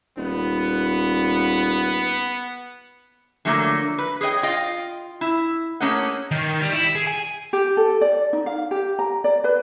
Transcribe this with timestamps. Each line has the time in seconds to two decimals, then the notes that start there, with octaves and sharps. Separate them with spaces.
0.17 D#1 B3
3.45 D3 F3 F#3 A3 A#3
3.98 B4
4.21 G#4 C#5 D#5 G5
4.43 F4 D#5 F5 G5
5.21 E4
5.80 A3 A#3 C#4 G#4 D#5 F#5
6.31 D#3
6.61 G3
6.72 E4
6.95 G#4
7.07 G#5
7.53 G4
7.77 A4
8.01 D5
8.33 D#4
8.46 F5
8.71 G4
8.99 A#5
9.24 D5
9.44 B4